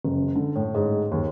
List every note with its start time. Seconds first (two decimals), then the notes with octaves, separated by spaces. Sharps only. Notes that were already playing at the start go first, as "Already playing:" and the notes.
0.05 F#1
0.35 D3
0.55 A2
0.75 G#2
1.11 D#2